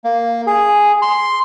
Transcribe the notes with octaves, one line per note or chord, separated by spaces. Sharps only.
A#3
G#4
C6